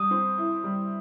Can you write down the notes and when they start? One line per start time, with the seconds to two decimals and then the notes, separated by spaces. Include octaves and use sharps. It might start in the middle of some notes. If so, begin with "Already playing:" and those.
Already playing: G3 D#6
0.11 C4
0.38 E4
0.64 G3